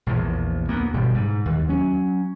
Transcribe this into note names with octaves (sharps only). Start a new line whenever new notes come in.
A#1 E2 F3
D2 A#3 B3
G1 B2 G3
G#2
D#2
F#3 C#4